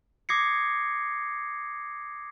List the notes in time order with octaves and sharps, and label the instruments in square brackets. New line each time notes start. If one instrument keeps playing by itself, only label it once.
[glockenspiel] D6 D#6 G#6 A#6 C7 C#7